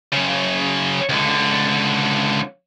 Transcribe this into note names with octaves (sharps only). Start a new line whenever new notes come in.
F#2 C#3
C#2 D3